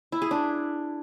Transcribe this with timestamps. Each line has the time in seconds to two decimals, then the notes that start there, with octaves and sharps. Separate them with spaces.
0.12 E4
0.22 G#4
0.31 D4